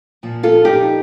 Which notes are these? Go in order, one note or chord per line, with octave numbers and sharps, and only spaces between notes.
A#2 F3
F4 A4
D#4 G4